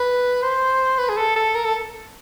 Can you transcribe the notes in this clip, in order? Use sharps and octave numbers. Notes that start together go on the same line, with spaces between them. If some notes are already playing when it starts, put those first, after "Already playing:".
Already playing: B4
C5
B4
G#4
A4
A4
A#4
A4